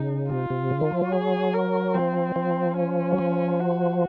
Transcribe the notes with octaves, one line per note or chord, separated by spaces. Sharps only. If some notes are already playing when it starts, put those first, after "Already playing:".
Already playing: C#3 D#4
C3 F4
C3
C#3
D#3
F3
F#3
G#4
A#4
F3 C4
F3
C#4
F#3
F3
F#4